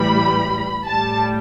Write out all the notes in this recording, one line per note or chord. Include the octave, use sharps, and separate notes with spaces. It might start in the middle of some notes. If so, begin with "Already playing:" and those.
Already playing: A2 E3 G3 B5
A2 G3 A5